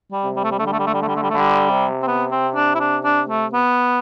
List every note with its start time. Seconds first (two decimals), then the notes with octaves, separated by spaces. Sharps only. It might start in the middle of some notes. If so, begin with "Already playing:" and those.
0.12 G3
0.24 C3
0.36 G3
0.44 A3
0.51 G3
0.59 D3 A3
0.66 G3
0.72 A3
0.79 G3
0.86 A3
0.94 G3
1.02 A3
1.08 G3
1.16 A3
1.22 G3
1.30 A3
1.33 D3 G3
1.70 C3
2.02 C4
2.07 B3
2.31 C4
2.55 D4
2.75 E4
2.80 D4
3.04 D4
3.29 A3
3.53 B3